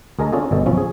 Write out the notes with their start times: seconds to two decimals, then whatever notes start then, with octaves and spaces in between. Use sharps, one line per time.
0.19 D2 G#4 A#4 D#5 A5 A#5
0.32 C#4 D4 F4 G#4 A4
0.51 G1 B2 A4 D#5
0.66 B1 F3 C#4
0.78 G#4